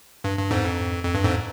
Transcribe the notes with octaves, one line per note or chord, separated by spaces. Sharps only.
G2
G2
F2 G#2
F2
F2
G2
F2 G#2